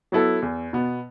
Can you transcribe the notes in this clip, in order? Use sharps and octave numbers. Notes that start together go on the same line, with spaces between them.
F#3 B3 E4 A4
E2
B2 B3